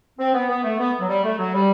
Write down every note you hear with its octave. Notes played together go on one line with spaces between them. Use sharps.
C4
B3
B3
A3
B3
F#3
G3
A3
F#3
G3